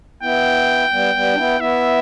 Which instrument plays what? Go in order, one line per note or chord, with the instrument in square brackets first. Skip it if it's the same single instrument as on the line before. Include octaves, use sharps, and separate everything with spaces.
[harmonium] B3 E4 [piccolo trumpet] G5
[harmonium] G3 B3
G3 B3
D4
B3 E4
[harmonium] B3 E4 [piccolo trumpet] E5